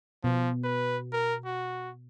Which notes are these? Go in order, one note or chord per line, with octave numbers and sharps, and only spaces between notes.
B2 F3
B4
A#4
F#4